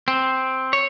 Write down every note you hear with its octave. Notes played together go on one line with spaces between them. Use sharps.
C4
C#5